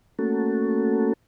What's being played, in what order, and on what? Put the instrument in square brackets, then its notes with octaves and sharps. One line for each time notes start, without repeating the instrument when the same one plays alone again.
[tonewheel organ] A3 A#3 C#4 F#4 A4